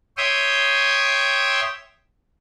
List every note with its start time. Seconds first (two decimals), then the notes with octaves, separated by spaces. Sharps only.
0.17 C#5 E5 G5 C6 D#6